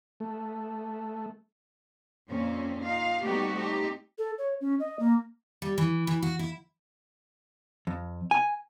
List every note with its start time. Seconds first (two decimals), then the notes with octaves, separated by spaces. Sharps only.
0.20 A3
2.30 F2 A#2 A#3 C4 C#4
2.83 D#4 F4 F5
3.24 G3 A3 B3 D#4 F#4 G4
3.52 A3 C4 D#4 G4
4.18 A4
4.38 C#5
4.61 C#4
4.80 D#5
4.99 A#3
5.62 G3
5.78 E3
6.07 E3
6.22 F#4
6.39 E4
7.87 F2
8.31 G#5